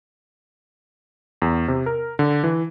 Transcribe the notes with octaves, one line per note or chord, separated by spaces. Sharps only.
E2
C3
A#4
D3
E3